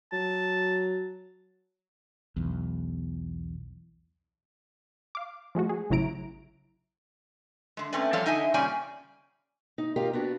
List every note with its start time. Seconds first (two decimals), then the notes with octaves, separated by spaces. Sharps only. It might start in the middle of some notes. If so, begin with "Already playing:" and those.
0.13 F#3 A5
2.36 B1 E2
5.15 F5 D6
5.55 F3 G#3 A3 F#4
5.69 G#4
5.90 A1 C#3 F#3 E4 A#5 D7
7.77 D3 G#3
7.93 A3 C4 C#4 B4 D5
8.13 F3 G3 A4 C#5 D5 F5
8.26 D3 D#4 D#5 E5 G#5
8.54 A#2 C#3 G3 C#4 D5 G#5
9.78 D#4
9.96 F4 G4 A#4 D#5 F5
10.13 B3 D4 F#4